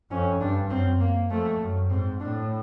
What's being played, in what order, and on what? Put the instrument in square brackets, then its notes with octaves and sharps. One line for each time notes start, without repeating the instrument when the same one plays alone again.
[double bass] F2 [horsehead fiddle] C#4
[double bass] G2 [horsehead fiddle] D4
[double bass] F#2 [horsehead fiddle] C4
[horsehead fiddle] A#3
[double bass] F2 [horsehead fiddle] A3
[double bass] F#2
[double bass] G#2 [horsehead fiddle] C4
[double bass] A2 [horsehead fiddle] D4